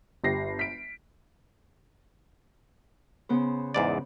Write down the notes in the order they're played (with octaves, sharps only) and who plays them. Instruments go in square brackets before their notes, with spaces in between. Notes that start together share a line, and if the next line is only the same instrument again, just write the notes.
[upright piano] G1 G4 A#6 C7
B6 D7
[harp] C#3 B3 C5
[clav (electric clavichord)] E2 G#2 D5